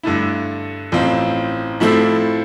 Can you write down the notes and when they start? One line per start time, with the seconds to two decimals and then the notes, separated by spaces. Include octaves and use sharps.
0.03 G2 D3 A3 E4
0.92 A1 A2 F3 C4 F4
1.80 A2 F3 A3 C4 E4